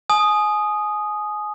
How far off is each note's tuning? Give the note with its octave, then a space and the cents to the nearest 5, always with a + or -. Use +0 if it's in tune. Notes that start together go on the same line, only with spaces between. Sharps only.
G#5 +25 D#6 -5